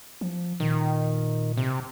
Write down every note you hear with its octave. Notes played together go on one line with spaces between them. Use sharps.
F3
A#2 D#3
C3